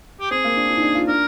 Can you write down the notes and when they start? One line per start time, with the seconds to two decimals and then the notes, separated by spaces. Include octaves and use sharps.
0.20 G4
0.31 C4 G#4
0.44 A#3
0.57 D4
0.70 D4
0.77 D#4
0.82 D4
0.95 F4
1.08 D4 A#4